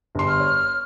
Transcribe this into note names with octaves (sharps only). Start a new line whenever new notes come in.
G1 C6
F6
C#5